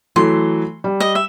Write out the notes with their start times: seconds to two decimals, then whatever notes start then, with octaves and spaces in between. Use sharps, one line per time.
0.16 E3 F#3 A3 C6
0.84 G3
1.00 D#5
1.15 E5